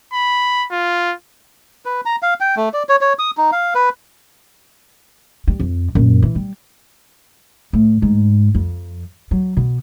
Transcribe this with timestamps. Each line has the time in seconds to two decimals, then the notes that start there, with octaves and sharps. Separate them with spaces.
0.13 B5
0.72 F4
1.85 B4
2.05 A#5
2.23 F5
2.40 G5
2.57 A3
2.74 D5
2.89 C#5
3.01 C#5
3.19 D#6
3.37 D#4
3.52 F5
3.75 B4
5.48 G3
5.60 F2
5.95 F#2 A#2
6.22 E3
6.36 G3
7.73 A2
8.02 G#2
8.55 F2
9.31 F#3
9.57 B2